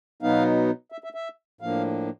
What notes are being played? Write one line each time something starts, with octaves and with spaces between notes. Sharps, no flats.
B2 F#3 B3 D#4 F5
E5
E5
E5
A2 F3 A#3 D4 F5